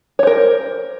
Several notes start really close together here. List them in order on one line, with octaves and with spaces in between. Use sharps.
C#5 C5 A#4